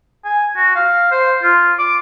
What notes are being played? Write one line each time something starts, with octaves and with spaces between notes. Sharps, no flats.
G#5
F#4
F5
C5
F4
D6